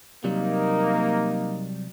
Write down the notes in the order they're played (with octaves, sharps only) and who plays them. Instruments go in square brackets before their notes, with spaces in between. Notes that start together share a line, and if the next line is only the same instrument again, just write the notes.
[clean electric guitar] C3 F#3 G3 [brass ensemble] A#3 D#4